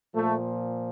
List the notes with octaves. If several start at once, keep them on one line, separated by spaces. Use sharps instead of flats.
A#2 F3 A3